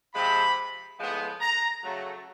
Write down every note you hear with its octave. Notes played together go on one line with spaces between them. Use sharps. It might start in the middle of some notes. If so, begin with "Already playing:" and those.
C3 F3 G#3 C4 B5
A2 F3 G#3 B3
A#5
C#3 F#3 A3